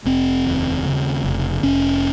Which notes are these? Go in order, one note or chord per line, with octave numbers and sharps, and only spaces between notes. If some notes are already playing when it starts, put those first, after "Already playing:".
F1 C4
D#2
C#3
F1
F1 C#4